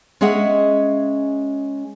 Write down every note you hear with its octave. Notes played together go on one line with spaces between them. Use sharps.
G#3 C#4 G#4 D#5 E5 F#5